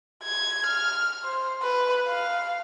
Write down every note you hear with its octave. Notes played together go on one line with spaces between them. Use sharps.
G#6
F6
C5
B4
F5